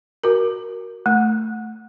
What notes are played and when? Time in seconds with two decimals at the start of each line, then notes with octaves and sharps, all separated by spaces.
0.24 F#4 A#4
1.06 A3